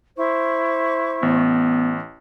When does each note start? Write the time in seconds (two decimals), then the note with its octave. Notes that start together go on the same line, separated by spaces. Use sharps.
0.17 E4 C5 C#6
1.23 A1 B3